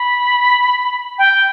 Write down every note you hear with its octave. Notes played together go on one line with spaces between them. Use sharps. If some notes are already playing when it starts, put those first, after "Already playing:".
Already playing: B5
G5